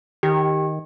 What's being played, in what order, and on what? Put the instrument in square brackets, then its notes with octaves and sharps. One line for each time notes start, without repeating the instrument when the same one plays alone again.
[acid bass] D#3 [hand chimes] G4